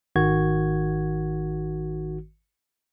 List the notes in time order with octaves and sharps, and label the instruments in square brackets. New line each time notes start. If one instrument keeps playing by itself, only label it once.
[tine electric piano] G#1 D#3 F#4 G#6